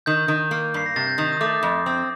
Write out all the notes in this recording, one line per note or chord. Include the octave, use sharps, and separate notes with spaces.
D#3 G6
D#3
A#3
G2 C7
A#6
C3 A6
G6
D#3 G6
D#6
A3 D6
F2
C4